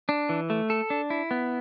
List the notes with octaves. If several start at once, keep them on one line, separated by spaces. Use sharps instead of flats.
D4
E3
A3
A4
D4
E4
B3